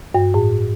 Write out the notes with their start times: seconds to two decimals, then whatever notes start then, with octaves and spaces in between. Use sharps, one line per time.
0.14 G2
0.34 A2